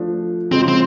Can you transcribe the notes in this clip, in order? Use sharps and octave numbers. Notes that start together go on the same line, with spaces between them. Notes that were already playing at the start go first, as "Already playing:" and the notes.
Already playing: F3 A3 D4
C#3 F3 G#3 C4
C4